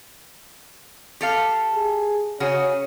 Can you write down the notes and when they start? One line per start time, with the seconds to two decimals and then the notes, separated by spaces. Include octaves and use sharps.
1.21 G4 A4 F5
1.75 G#4
2.40 C#3 C#4 F#4 G#4